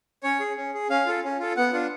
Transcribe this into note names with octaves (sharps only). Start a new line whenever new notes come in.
C#4 C#5
G#4
C#4
G#4
C#4 F5
F4 A4
C#4
F4 A4
B3 F#5
D4 F4